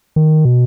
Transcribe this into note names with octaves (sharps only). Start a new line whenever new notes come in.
D#3
B2